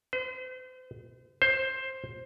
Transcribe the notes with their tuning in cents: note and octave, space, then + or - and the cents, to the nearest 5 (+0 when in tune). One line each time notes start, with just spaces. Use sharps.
C5 -40
C5 +10